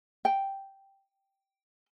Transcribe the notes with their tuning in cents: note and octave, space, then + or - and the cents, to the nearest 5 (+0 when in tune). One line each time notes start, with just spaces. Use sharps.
G5 -5